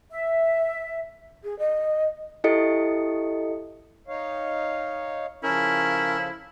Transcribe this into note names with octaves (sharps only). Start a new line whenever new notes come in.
E5
G#4
D#5
E4 G4 A4 D#5 C#7
D#4 C#5 F5
C#3 F3 C#4 E4 A4 A#4